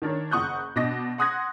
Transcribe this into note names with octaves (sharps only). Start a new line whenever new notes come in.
D#3 D4 A#4 C#5
F#1 F#5 C#6 D#6 F#6 G6
B2 D4 D#5 D6 A#6
F#5 C6 D#6 F#6 G#6 A#6